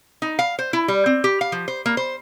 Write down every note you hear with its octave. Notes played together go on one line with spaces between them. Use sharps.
D#4
F5
C5
E4
G3
C4
G4
F5
F3
C5
A#3
C5